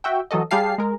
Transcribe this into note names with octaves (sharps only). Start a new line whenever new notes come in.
F#4 E5 G5
E3 F#3 F#4 A4 D#5
G3 G4 G#4 F5 A5 C7
G#3 A#4